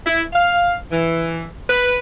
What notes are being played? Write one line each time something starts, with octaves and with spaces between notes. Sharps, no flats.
E4
F5
E3
B4